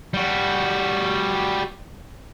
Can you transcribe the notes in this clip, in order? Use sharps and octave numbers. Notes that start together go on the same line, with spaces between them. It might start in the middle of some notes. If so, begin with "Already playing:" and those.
G3 F#4